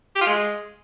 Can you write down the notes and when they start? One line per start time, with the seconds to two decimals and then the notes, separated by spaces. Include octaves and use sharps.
0.16 G4
0.21 F4
0.27 G#3